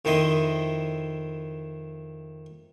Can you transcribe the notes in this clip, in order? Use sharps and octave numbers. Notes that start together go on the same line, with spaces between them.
F2 D#3 E4 D#5 C6